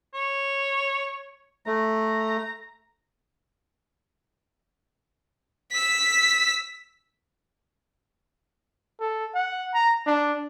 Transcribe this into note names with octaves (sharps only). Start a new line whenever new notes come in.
C#5
A3 A#5
E6 B6
A4
F#5
A#5
D4